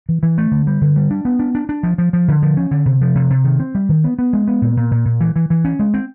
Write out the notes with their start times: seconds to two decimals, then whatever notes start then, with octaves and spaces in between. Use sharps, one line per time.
0.09 E3
0.23 E3
0.38 A3
0.52 D3
0.67 G3
0.82 D3
0.96 G3
1.11 D4
1.25 B3
1.39 D4
1.55 D4
1.69 D4
1.83 F3
1.98 F3
2.13 F3
2.28 D3
2.42 F3
2.57 C#4
2.71 D3
2.86 C3
3.01 F3
3.15 C3
3.30 C3
3.44 D#3
3.60 C4
3.75 G3
3.89 D#3
4.04 B3
4.19 B3
4.33 G#3
4.48 B3
4.62 A#2
4.77 A#2
4.91 A#2
5.05 A#2
5.21 E3
5.36 E3
5.50 E3
5.65 C#4
5.79 G#3
5.94 C4